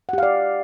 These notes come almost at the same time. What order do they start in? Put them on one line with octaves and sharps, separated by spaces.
F#5 G4 F5 D5